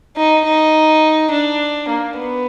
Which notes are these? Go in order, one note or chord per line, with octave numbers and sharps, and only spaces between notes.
D#4
D#4
D4
A#3
B3